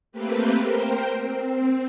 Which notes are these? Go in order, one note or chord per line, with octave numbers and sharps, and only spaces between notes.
A3 A#3 C4 G4 B4
A#4 C5 G5
C4